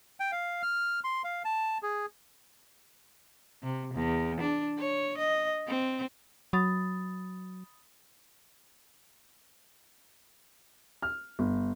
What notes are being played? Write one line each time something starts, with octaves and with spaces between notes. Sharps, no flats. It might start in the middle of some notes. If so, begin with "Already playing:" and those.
G5
F5
F6
C6
F5
A5
G#4
C3
E2
D4
C#5
D#5
C4
F#3 B5 D#6 A6
F6
G1